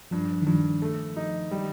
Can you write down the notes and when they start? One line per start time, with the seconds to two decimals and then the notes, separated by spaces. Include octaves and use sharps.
0.11 G2 F3
0.42 D#3
0.46 G2 F3
0.82 A3
1.16 D#4
1.51 G3